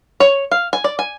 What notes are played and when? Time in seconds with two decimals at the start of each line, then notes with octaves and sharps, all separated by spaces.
0.20 C#5
0.52 F5
0.73 G#5
0.84 D5
0.99 G#5